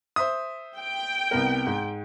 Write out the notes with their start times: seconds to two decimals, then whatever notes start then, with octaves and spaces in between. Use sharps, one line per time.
0.16 C5 E5 D#6
0.78 G5
1.31 C2 B3 A#4
1.67 G#2